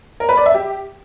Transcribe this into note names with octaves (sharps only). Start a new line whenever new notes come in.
A#4
B4
D5
E5
G4